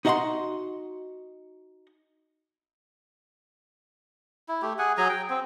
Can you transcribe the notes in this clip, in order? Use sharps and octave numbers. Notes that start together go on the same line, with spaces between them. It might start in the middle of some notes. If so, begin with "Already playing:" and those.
D#4 F#4 D#5 F5 F#5 C6
E4
A3 G4
G#4 F#5 G#5
F#3 G#4 G#5 A#5
G5
C4